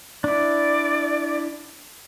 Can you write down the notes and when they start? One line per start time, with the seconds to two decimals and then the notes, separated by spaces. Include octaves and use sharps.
0.24 D4 E4 D5